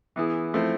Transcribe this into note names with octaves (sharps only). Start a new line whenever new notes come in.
E3 B3 E4 G#4
F3 A3 C4 E4